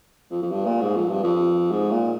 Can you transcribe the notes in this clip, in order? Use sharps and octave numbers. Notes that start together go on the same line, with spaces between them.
F2
F2
G2
A#2
G#2
F2
G2
F2
G#2
A#2